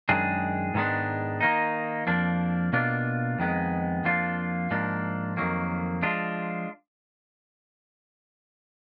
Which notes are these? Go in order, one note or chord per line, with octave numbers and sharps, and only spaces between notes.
F#2 D#3 G#3 D4 G#4
G#2 D#3 G#3 B3 D4
D#3 A#3 D#4
F2 F3 A#3 D4
B2 A#3 D4 F4
F2 D#3 G#3 B3
F2 F3 A#3 D4 F4
G#2 F3 A#3 D4
F2 D#3 F#3 A#3
F3 G#3 D4 F4